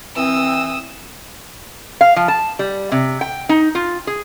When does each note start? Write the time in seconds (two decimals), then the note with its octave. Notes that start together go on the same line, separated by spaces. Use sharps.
0.15 E3 C4 D#6 E6
2.01 F5
2.16 F3
2.28 A5
2.59 G3
2.92 C3
3.21 G5
3.49 D#4
3.75 F4
4.07 G#4